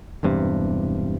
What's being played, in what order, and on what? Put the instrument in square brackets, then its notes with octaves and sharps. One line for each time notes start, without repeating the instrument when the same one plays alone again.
[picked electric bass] E1 E2 G2 C3